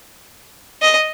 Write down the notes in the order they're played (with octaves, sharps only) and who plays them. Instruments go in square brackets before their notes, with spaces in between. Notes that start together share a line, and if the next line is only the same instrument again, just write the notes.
[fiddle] D#5